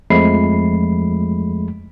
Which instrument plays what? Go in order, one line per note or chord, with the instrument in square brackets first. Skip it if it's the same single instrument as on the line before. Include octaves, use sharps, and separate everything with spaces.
[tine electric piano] F2 F3 G#3 A3 B5 C7